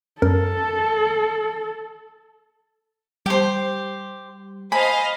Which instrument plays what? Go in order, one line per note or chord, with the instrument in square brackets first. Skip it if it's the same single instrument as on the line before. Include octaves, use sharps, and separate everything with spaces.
[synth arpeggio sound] F#2 A#4 [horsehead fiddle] A4
[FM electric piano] G3 [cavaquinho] G4 C5
[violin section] C5 D#5 F5 [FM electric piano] G#5 [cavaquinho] B5